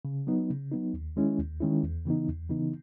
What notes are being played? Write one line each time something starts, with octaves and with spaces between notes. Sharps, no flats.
C#3
F#3 B3 D#4
C#3
F#3 B3 D#4
D#2
D#3 G#3 C#4 E4
D#2
D#3 G#3 C#4 E4
E2
C#3 E3 B3 D#4
E2
C#3 E3 B3 D#4